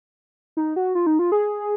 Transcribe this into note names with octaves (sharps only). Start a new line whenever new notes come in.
D#4
F#4
F4
D#4
F4
G#4